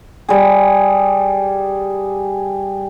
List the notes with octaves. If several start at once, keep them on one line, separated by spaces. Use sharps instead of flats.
G3 G#4